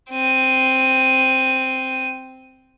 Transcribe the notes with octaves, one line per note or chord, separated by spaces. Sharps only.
C4 D#7